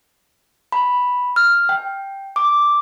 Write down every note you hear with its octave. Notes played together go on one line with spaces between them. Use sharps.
B5
F6
G5
D6